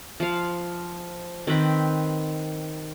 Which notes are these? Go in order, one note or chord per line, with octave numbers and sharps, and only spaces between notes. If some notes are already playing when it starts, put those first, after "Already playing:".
F3 F5
D#3 C4 B4 G5